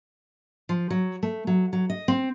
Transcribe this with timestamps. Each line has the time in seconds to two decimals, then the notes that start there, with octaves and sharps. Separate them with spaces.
0.69 F3
0.90 F#3
1.23 A3
1.47 F#3
1.73 F#3
1.90 D#5
2.08 C4